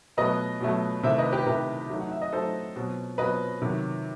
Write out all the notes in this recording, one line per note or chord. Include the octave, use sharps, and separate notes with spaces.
B2 F#3 A3 B4 D#5
B2 F#3 A3
C3 D#3 A3 E4 C5 E5
B4 D#5
G4 B4
C3 D#3 A3 E4 G4 B4
F#3 A3 D#4
F#5
E5
D#5
F#3 A3 D#4 A4 C5
B2 F#3 C4
B2 F#3 C4 B4 D#5
C3 D#3 F#3